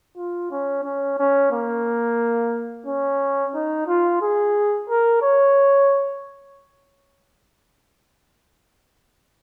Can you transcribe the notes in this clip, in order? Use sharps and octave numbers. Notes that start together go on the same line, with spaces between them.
F4
C#4
C#4
C#4
A#3
C#4
D#4
F4
G#4
A#4
C#5